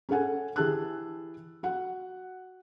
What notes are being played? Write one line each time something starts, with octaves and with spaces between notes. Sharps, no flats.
C#4 G#4 A4 F#5 G#5
E3 G4 G#4 A5 E6 F#6
F#4 F#5